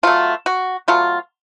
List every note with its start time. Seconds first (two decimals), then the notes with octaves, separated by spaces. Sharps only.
0.03 B2 F#3 A3 F4
0.46 F#4
0.88 B2 F#3 A3 F4